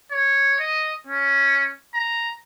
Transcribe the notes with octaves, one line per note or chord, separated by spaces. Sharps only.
C#5
D#5
C#4
A#5